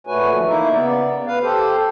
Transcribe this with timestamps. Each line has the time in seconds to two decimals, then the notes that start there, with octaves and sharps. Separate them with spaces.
0.07 A#2 A3 F#4 B4 C#5 G#5
0.32 D3 E3 F3
0.46 A#3 D#4 E4 E5
0.72 C#3 B3 D5
1.27 D2 B4 F5
1.42 G4 A4 C5